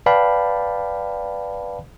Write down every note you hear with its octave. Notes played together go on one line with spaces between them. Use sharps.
B4 D5 F5 G5 A5 B5